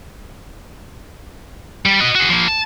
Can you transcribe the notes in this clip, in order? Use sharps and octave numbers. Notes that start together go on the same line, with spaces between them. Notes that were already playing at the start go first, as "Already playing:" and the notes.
G3
F#4 D#5
F#4 G#4
F3 A#3
A5